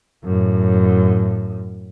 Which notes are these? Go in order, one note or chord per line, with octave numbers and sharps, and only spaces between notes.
F#2 A2